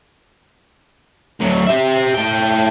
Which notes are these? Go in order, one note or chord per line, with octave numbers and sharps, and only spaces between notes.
D2 F#3
G4 E5
A2 G5